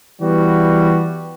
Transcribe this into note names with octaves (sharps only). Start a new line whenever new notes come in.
E3 G3 B3 F#4